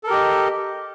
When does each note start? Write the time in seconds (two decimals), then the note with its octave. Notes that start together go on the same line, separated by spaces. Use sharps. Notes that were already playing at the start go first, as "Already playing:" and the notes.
0.04 A4
0.07 A#4
0.10 G4
0.14 D#5